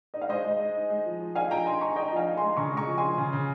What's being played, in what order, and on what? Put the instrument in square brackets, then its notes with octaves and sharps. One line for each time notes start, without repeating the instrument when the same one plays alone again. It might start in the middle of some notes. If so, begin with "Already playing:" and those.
[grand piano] D#4 [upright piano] D#5
[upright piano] F5
[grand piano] G#3 [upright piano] C5 D#5
[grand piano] G#3
G#3
D#4
G#3
F3
F3
[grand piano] D#4 [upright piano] F5 G#5
[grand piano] F3 [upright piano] G5 A#5
[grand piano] D#4 [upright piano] G#5 C6
[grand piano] D#4 [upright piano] A#5 C#6
[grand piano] D#4 [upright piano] D#5 G5
[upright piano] A#5
[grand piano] F3 [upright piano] F5 G#5
[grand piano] D#4
[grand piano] G#3 [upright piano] G#5 C6
[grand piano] C#3 [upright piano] A#5 C#6
[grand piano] G#3 [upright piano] A#5 C#6
[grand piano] F3
[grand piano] F3 [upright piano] G#5 C6
[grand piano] C#3
C#3